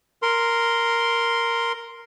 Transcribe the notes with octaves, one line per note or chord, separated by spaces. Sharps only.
A#4 C6